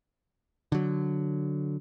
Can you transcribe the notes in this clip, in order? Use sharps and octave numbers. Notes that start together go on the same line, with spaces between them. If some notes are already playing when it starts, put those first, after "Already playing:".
D3 F#3